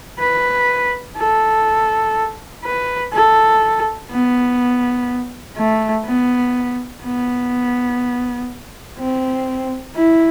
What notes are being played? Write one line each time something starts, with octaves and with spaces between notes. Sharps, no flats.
B4
A4
B4
A4
B3
A3
B3
B3
C4
E4